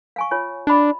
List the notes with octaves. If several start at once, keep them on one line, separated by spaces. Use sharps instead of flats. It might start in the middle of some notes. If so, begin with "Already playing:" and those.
F5 G#5 C#6
F4 C#5 G#5
D4 D#5 B5